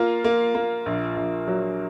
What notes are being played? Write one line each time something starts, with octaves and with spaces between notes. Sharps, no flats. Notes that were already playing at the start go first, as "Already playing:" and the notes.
Already playing: A#3 F4
A#3
A#3
A#1
A#1
F#3